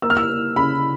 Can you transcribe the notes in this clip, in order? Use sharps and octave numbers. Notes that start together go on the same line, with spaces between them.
A#3 E6
F6
E6
A#3
C#3 B5